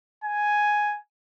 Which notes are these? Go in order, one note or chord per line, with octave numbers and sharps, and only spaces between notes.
G#5